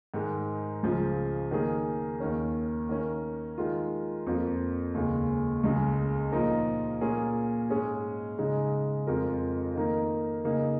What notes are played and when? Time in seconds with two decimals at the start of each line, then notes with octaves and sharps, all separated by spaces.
0.14 G#2 D#3 G#3
0.83 C#2 C#3 F3
1.51 D#3 A#3 C#4 G#4
2.20 D#2 D#3 C#4
2.89 D#3 A#3 C#4
3.58 D#3 G#3 F4
4.26 F2 F3 A#3
4.95 D#2 C#3 G#3
5.63 C#2 C#3 G#3
6.32 A#2 F3 A#3 D#4 A#4
7.01 A#2 A#3 C#4 G#4
7.70 G#2 G#3 C#4 G#4
8.38 C#3 G#3 D#4
9.07 F2 F3 G#3 F4 A#4
9.76 D#3 A#3 D#4 A#4
10.45 C#3 A#3 D#4